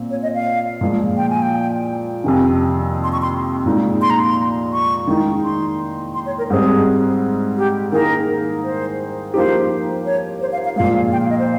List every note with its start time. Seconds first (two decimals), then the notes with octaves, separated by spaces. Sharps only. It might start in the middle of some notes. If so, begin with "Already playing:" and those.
Already playing: A#2 C4
0.11 C#5
0.23 D#5
0.34 F5
0.81 A#2 F3 G#3
1.17 G5
1.30 G#5
1.42 G5
2.24 F2 C3 D#3 G#5
3.04 C6
3.12 C#6
3.22 C6
3.66 A#2 G#3 D#4
4.01 C6
4.10 A#5
4.20 C6
4.73 C#6
5.07 D#3 G#3 D#4
5.43 C6
6.14 C6
6.26 C#5
6.38 A#4
6.50 G#2 G3 C4 G#4
7.57 G4
7.92 D#3 A#3 D#4 G#4 A#4
8.64 C5
9.34 F3 A#3 D#4 G4 C5
10.06 C#5
10.41 C5
10.52 F5
10.65 F5
10.76 A#2 F3 G#3 F5
11.12 G5
11.21 F5
11.30 D#5
11.39 C5